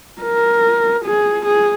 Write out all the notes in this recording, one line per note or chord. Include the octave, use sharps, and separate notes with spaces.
A#4
G#4
G#4